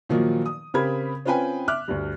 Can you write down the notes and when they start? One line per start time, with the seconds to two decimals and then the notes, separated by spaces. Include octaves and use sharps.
0.09 A#2 D#3 F3 F#3 A#3 D#4
0.46 D#6
0.74 C#3 C4 G4 A#4 B5 G#6
1.25 C4 C#4 F4 B4 G5 G#5
1.68 E5 D6 F6 F#6
1.88 D2 G2